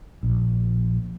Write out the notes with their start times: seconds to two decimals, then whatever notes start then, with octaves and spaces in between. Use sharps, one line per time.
0.23 A#1